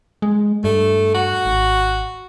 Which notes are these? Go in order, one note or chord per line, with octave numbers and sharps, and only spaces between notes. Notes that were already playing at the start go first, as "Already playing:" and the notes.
G#3
G2 A3
F#4
G#1